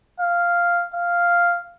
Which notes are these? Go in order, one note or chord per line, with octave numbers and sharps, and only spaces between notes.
F5
F5